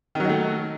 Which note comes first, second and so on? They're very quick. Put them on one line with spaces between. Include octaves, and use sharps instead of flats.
D#3 F#3 D#4 A3